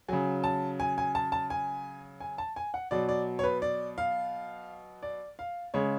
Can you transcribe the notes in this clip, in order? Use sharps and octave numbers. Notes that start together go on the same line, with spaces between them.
C#3 F#3 G#5
A5
G#5
G#5
A5
A5
G#5
G#5
A5
G#5
F#5
B2 F#3 D5
D5
C#5
B4
D5
F5
D5
F5
C#3 G#3 C#5